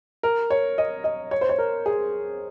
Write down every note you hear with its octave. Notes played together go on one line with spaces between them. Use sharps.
A#4
C#5
D#5
D#5
C#5
C5
C#5
A#4
G#4